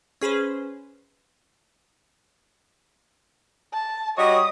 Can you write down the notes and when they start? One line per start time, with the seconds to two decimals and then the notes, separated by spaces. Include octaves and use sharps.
0.21 C#4 G#4 B4 C5
3.73 A5
4.18 G3 F#4 C#5 D#5 D#6